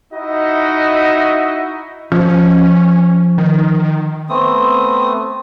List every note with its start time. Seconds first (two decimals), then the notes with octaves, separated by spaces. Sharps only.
0.12 D#4 E4 F#4 D#5 E5
2.12 F3 C#4
3.38 D#3
4.29 A3 B3 C4 D#6